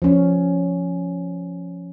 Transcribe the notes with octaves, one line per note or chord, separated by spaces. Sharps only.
F3 C#4